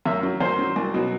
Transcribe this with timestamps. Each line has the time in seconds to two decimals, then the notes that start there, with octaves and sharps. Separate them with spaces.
0.05 F#2 E5
0.23 F#3
0.40 F#2 C5
0.59 F#3
0.76 C2
0.94 B2 F#3